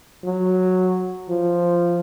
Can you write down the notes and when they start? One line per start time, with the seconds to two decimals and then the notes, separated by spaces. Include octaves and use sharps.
0.24 F#3
1.29 F3